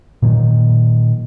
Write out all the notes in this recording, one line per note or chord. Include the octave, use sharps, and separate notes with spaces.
A#2 D#3 F#3